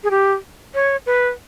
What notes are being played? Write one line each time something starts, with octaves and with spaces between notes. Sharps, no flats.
G#4
G4
C#5
B4